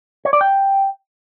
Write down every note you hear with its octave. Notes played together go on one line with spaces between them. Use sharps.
C#5
D5
G5